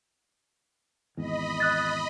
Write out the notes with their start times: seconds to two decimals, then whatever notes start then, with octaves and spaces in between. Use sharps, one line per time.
1.17 G#1 E2 D#5 B5
1.60 D#6 F#6 A6